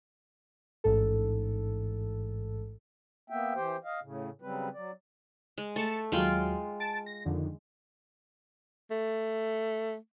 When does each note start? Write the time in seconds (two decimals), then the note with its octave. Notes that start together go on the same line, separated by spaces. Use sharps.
0.84 A1 G#2 A4
3.30 A#3 B3 E5 G5
3.55 E3 G4 C5 G5
3.85 D#5 F5
4.02 A2 C#3
4.42 C#3 F#3 G3 C4 B4
4.74 F#3 D5
5.58 G#3
5.76 A3 A6 C#7 E7
6.12 D#2 F#3 G#3 F4 G5
6.80 A5 A6 D7
7.06 A#6
7.25 F2 D3 D#3
8.91 A3